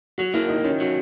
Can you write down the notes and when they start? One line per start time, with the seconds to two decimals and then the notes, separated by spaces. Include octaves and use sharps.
0.18 F#3 F#4
0.34 A#3 E4
0.49 D#3 D#4
0.64 D#3 C#4
0.80 F#3